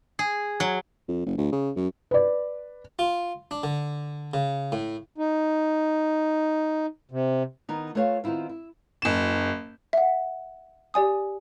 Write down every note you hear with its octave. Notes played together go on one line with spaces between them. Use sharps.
G#4
F#3
F2
F#1
D2
C#3
F#2
B4 D5
F4
D4
D3
C#3
A2
D#4
C3
D#3 B3 D#4
A3 F4 B4 C#5 E5 F5
D#3 B3 C4 E4 F4
E4
F#1 E7
E5 F#5
G4 D5 G#5 D#6